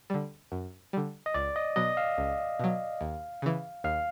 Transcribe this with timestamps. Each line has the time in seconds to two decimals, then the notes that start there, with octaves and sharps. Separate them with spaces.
0.10 D3 G3
0.52 F#2
0.93 D3 G3
1.26 D#5
1.34 C#2 D5
1.56 D#5
1.76 B2 F#3 D#5
1.97 F5
2.18 C#2
2.60 B2 F#3
3.01 D#2
3.42 C#3 E3
3.84 D#2 F5